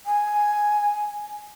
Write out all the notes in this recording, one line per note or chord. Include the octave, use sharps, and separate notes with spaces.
G#5